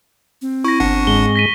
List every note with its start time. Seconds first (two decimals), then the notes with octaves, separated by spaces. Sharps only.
0.42 C4
0.64 E4 C#6 A#6
0.80 G1 D4 F#5
1.07 G#2 G#3 G7
1.36 A#6 B6 D#7